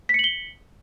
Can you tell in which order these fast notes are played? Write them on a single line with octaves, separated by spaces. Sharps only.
B6 C#7 F#7 G7